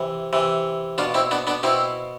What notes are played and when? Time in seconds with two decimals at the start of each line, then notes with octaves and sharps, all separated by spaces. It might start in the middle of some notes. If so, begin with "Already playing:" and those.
Already playing: C3 E3
0.33 C3 E3
0.98 B2 D4 F4
1.14 C4 E4
1.31 B3 D4
1.47 B3 D4
1.63 B2 C4 E4